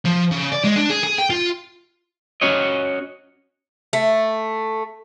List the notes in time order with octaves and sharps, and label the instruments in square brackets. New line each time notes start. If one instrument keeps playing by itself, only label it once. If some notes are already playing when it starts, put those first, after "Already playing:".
[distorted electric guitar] F3
C#3
D5
G#3
D4
G#4
G#4
G5
F4
[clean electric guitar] C#4 F#4 C#5 D#5
[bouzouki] A3